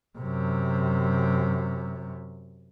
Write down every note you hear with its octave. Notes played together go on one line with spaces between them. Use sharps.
F#2 C3